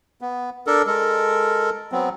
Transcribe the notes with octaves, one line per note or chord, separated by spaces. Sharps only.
B3
D4 A4 A#4
G#3 A4 A#4
F#3 B3 C4